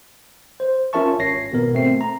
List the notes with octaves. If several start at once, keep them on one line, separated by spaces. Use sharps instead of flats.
C5
C#4 F4 A#4 E5 A5 C#6
G#1 C#5 A#6 C7
G#1 B2 B3 A#4
A3 C4 C7
A#5